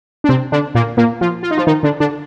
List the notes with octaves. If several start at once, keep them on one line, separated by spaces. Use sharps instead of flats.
D4
C3 C4
D3 D4
A#2 A#3
A#2 A#3
F3 F4
F4
D#4
F3 F4
D#3 D#4
D3 D4
D3 D4